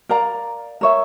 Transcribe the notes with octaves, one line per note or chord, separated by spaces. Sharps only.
A#4 D5 F5 A#5
A#4 C#5 E5